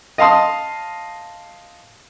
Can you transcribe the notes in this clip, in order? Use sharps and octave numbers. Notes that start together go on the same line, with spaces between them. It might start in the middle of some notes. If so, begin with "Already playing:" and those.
D#5 F5 A5 C6 D#6